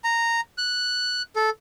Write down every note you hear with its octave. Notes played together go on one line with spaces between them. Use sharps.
A#5
F#6
A4